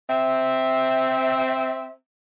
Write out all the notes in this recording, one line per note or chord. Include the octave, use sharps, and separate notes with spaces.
C4 E5